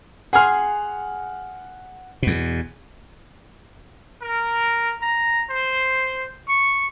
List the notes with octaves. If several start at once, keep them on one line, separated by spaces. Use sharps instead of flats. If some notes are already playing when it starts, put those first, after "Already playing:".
G#4 F#5 G#5 C6 F6
E2 B2
A#4
A#5
C5
C#6